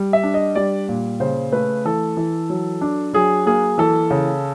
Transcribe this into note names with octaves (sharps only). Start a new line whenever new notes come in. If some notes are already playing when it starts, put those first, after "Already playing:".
Already playing: G3
E5
D4
D#5
G3 D5
A#2
C#3 C5
A3 B4
E3 A4
E3
F#3
D4
F#3 G#4
A#3 G#4
E3 A4
C#3